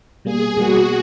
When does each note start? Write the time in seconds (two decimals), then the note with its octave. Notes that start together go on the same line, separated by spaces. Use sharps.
0.25 B2 G3 A#3 G#4
0.57 B2 G3 A#3 F#4